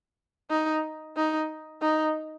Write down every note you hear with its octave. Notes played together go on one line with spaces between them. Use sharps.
D#4
D#4
D#4